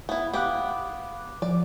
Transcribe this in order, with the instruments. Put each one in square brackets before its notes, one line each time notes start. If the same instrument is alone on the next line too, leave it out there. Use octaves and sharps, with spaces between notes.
[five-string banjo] B3 E4
[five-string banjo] B3 G4 [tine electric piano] F5 D6 F#6
[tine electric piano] F3 [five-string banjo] D5